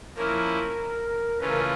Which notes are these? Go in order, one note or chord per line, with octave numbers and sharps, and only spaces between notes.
F3 A#3 C#4 E4 A#4
C#3 E3 A3 C#4 F4 B4
A#4
B4